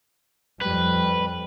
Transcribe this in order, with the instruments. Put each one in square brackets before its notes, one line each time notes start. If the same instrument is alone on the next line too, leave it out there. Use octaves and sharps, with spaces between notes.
[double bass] F2 G3 [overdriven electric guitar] B4